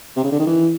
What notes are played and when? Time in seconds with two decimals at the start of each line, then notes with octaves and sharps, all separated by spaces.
0.17 C3
0.24 C#3
0.32 D3
0.39 D#3
0.47 E3